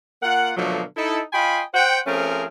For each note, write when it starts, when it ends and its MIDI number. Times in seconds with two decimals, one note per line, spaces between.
0.22 0.52 58
0.22 0.52 65
0.22 0.52 70
0.22 0.52 78
0.57 0.82 47
0.57 0.82 50
0.57 0.82 53
0.57 0.82 54
0.57 0.82 57
0.57 0.82 58
0.96 1.21 63
0.96 1.21 64
0.96 1.21 69
1.33 1.62 65
1.33 1.62 75
1.33 1.62 79
1.33 1.62 80
1.33 1.62 83
1.33 1.62 84
1.74 2.00 72
1.74 2.00 78
1.74 2.00 79
2.07 2.46 53
2.07 2.46 57
2.07 2.46 60
2.07 2.46 61
2.07 2.46 68
2.07 2.46 70